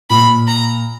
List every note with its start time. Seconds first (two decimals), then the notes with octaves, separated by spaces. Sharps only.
0.10 A#2 B5
0.47 A#5